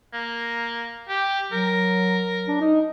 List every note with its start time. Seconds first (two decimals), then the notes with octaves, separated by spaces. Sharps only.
0.13 A#3
1.09 G4
1.52 F#3 A#4
2.48 D4
2.61 D#4